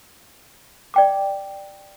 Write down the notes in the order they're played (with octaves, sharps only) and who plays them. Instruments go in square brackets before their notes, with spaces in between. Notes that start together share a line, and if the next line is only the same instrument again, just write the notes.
[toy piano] D5 G5 D6